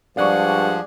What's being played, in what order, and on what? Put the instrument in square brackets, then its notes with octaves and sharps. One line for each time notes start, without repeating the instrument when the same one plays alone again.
[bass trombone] G2 [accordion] F3 [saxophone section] G#3 G#4 F#5 [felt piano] D5 C#6